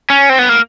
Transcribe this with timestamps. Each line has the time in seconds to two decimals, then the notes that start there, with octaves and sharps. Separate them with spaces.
0.10 C#4
0.29 C4
0.39 B3
0.49 A#3